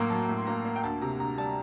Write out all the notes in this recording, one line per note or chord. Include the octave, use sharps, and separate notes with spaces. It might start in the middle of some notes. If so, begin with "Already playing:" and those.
Already playing: A2 F#3 A#3 G5 A#5 C6
F#3 A5
A2
C6
A#3 A#5
A#3
G5
D2 A5
C3 A#5
D2 A#5
G3 A5